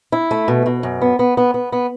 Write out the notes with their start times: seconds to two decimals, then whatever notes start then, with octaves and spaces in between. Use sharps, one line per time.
0.12 E4
0.31 A3
0.48 B2
0.66 B2
0.83 F#2
1.02 B3
1.19 B3
1.37 B3
1.54 B3
1.72 B3